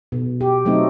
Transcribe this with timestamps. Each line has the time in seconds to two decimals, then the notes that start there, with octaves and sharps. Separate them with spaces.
0.12 B2
0.41 G4
0.65 F#3 A3 C4 D#4